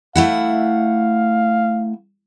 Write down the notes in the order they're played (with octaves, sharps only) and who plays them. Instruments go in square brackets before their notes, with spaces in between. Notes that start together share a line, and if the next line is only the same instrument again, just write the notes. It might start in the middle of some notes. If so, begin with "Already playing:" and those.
[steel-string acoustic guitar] A3 E4 F#5 [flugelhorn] F5